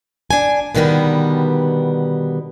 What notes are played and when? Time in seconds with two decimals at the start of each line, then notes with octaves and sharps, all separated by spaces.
0.31 D4 G#5
0.75 B2 D3 D#3 G3 B3